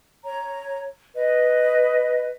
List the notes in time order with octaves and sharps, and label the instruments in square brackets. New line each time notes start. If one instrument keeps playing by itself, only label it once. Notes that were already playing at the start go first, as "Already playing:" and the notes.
[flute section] C#5 A#5
B4 D#5